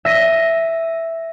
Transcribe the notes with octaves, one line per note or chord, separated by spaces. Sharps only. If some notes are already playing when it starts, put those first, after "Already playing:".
E5 A#6 D#7